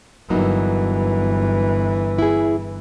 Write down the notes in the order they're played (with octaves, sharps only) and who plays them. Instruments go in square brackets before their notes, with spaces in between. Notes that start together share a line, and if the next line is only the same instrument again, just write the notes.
[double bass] G1 E3 [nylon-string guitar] F#3 A#3 D#4
[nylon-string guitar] E4 G#4